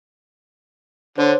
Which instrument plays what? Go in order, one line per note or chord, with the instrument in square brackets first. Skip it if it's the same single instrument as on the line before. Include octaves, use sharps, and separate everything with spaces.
[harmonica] D3 [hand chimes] C5 C#5